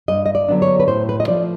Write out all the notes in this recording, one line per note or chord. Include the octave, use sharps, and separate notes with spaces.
G2 D#5
D#5
D5
D3 F#3 B3 D4
C#5
B4
A2 C5
B4
D#5
F3 A3 D5